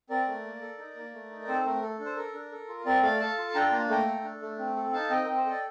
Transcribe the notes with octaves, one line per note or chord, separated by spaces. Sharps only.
C4 A#4 D5
A3
A#3
A4
D#4
A#3
A3
D#4
C4 A4 C5
A3 A#4
A4
D4
C5
A4 A#4
D4
A4
F4
C4 A#4 D5
A3 D5 F5
A4 F5 A5
F4
D4 G5 A#5
A#3 A#5
A3 G5 A#5
A4
D4
A3
C4
A4
D#4 F5 A5
C4 D#5 G5
C4 A#4
C5
A4
D5